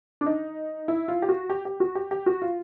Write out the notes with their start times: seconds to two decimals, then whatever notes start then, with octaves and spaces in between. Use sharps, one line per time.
0.21 D4
0.26 D#4
0.88 E4
1.08 F4
1.22 G4
1.29 F#4
1.50 G4
1.65 G4
1.80 F#4
1.95 G4
2.11 G4
2.26 F#4
2.42 F4